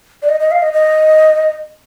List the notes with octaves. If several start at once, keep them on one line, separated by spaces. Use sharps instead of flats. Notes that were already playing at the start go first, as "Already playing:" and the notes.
D5
D#5
D#5
F5
D#5
D#5